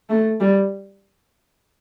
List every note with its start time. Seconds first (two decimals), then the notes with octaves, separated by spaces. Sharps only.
0.10 A3
0.40 G3